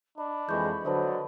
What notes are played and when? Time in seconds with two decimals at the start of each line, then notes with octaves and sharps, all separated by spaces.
0.18 D4 D#5 B5
0.49 F2 E3 G#3 C#6 G6
0.85 D3 F#3 B4 C5 D#5 A5